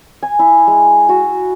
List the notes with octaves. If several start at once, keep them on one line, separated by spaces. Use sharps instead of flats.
G#5
E4
G#3
F#4